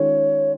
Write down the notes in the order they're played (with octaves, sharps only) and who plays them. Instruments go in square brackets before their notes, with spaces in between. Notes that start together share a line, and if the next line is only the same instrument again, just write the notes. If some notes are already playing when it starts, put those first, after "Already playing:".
Already playing: [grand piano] D#3 G#3 C#4 F4 [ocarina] C#5